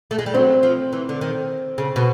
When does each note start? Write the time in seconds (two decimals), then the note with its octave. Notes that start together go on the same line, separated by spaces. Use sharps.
0.11 A3
0.19 G#3
0.26 G3
0.34 F#3 C4
0.63 F3
0.93 E3
1.09 D3
1.21 D#3
1.78 C#3
1.96 B2